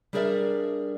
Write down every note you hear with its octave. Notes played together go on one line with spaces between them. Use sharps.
G3 D4 G#4 A#4 D5 E5